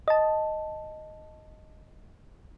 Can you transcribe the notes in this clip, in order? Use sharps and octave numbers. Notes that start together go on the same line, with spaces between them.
D#5 A5